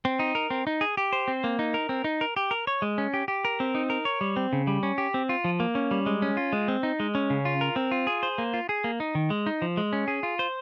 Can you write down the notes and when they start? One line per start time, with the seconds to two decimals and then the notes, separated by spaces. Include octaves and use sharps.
0.05 C4
0.19 D#4
0.35 A#4
0.50 C4
0.67 D#4
0.81 G#4
0.97 G4
1.13 C5
1.28 C4
1.44 A#3
1.59 D#4
1.74 A#4
1.89 C4
2.04 D#4
2.21 A#4
2.37 G4
2.51 A#4
2.67 C#5
2.82 G#3
2.98 C#4
3.14 G4
3.28 G4
3.45 A#4
3.60 C4
3.75 D#4
3.90 A#4
4.05 C#5
4.21 G3
4.36 C4
4.53 C#3
4.67 G3
4.83 C#4
4.98 G4
5.14 C4
5.29 F4
5.45 F3
5.60 A#3
5.75 C#4
5.91 G3
6.06 G#3
6.22 C#4
6.37 F4
6.53 G#3
6.68 C4
6.83 D#4
7.00 G#3
7.15 C#4
7.30 C#3
7.45 F4
7.61 A#4
7.76 C4
7.91 F4
8.07 G#4
8.23 C5
8.38 A#3
8.54 F4
8.69 G#4
8.84 A#3
9.00 D#4
9.15 D#3
9.30 G#3
9.46 D#4
9.62 F3
9.77 G#3
9.93 C#4
10.08 G#4
10.23 F4
10.39 C5